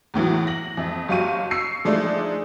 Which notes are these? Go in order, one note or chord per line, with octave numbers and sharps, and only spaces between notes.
E2 A2 E3 F#3
A#6 F#7
F2 E5
F#1 F#3 G4 F5 C#6 D#7
C#6 E6 C7 C#7
F3 G#3 A3 D4 D#4